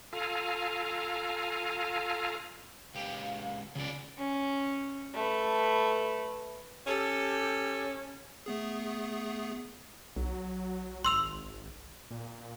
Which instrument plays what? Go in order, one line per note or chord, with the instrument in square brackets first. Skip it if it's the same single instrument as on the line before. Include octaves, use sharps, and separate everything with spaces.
[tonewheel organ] F4 A4 F5 G#5 A#5
[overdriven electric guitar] C#2 G4 [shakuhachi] F5
[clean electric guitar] C#2 [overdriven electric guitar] C#3 D5 [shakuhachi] F4
[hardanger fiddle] C#4
A3 B4
[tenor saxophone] C#4 [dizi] G4 [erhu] A4
[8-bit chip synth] A3 B3 G#4
[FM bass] B1 [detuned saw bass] F#3
[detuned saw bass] G#1 [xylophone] C6 E6 F7
[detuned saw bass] A#2